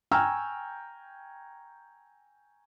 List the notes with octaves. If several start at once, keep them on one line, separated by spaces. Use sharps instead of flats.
G5 G#5 A#5 C#6 E6 F6